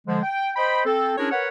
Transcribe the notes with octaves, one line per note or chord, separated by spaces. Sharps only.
D3 F3 G#3
G5
C5 D#5 G5 B5
C4 A4
C#4 D4 E4 G#4 A#4 C#5
A#4 B4 C#5 F#5